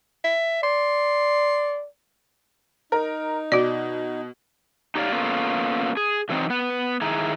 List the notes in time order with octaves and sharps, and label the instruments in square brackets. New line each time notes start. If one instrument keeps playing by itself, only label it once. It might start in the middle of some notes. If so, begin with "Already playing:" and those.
[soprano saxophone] E5
[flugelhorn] D5 [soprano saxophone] C6
[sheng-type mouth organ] D#4 [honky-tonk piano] A#4
[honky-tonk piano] B2 [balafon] F#4 D5
[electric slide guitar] D#4 G4 C#5 D5 F5
A#3 B3 C#4 F4 A4
G#4
D3 E3 F#3 C4 D4 D#4
B3 B4
D#3 E4 G#4 A#5